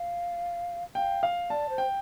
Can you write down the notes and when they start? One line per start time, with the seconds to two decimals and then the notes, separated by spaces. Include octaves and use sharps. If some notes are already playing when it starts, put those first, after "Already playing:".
Already playing: F5
0.95 F5 G5
1.23 F5
1.50 D5 A5
1.69 C5
1.78 G5